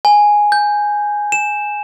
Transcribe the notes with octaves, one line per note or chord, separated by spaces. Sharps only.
G#5
G6
E7